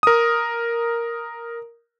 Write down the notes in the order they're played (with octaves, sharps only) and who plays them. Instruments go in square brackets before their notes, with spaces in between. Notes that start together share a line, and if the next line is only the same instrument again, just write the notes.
[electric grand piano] A#4 D#6